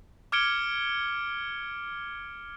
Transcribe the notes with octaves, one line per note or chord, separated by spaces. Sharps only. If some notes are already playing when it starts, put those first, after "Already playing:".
D6 F6 G#6 C#7 D7 G7